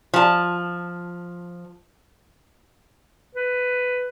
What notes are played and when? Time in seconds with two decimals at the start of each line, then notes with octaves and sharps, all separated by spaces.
0.14 F3 A5
3.35 B4